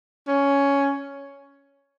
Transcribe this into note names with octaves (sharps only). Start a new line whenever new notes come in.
C#4